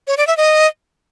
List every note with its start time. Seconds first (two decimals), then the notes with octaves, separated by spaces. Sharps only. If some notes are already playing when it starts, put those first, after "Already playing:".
0.07 C#5
0.17 D5
0.27 E5
0.37 D#5